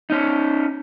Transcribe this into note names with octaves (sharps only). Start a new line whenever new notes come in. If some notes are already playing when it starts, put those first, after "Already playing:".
C#4 D#4